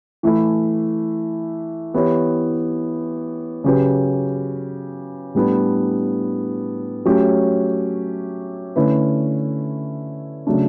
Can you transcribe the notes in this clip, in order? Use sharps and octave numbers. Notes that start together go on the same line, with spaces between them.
E3 A3 E4
E3 B3 E4 G4 C#5
C#3 F#3 C#4 G4 B4
A2 G3 B3 D4
F#3 A3 C#4 G4 C#5
D3 A3 C#4 E4 B4
C#3 F#3 A3 D4